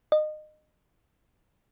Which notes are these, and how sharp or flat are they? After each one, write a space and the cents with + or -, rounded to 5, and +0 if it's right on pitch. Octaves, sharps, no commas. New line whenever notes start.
D#5 -25